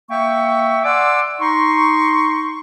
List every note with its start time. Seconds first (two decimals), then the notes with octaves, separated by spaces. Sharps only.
0.10 A#3 E5 G5 C#6
0.84 D5 F#5 G#5 C6 D6 E6
1.40 D#4 C6 C#6